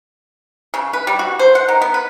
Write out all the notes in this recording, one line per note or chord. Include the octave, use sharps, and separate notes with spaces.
C#3
B4
G3
F#4
C5
F#5
D#3
B3
B4